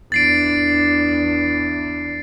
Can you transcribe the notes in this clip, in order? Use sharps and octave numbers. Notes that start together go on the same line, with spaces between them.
E2 D4 A6 C7 D7